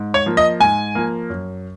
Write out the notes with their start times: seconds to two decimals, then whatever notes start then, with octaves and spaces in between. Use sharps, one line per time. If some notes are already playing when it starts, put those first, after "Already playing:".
Already playing: G#2
0.14 C#5
0.26 F3 A#3
0.37 D#5
0.60 G#2 G#5
0.95 F3 A#3
1.30 F#2